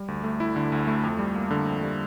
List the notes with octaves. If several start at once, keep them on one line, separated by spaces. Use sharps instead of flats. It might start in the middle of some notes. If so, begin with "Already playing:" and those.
Already playing: G3
D2
A3
E4
D3
D2
A3
F2
G3
A#3
D3
F2
G3